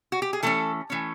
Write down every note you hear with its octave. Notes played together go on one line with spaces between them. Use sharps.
F#4
G4
G#4
E3 A3 C#4 A4
E3 A3 C#4